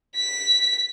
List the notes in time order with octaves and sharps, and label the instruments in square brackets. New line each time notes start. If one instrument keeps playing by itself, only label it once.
[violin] B6